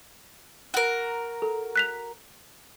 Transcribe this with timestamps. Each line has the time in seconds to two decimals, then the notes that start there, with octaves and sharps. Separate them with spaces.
0.74 F#4 A#4
1.42 A4
1.76 F#6 B6 F7